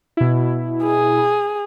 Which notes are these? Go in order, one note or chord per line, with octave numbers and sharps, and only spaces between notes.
B2 E4
G#4